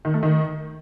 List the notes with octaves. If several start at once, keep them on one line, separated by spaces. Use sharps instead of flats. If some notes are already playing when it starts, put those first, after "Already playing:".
D#3
A3
D#3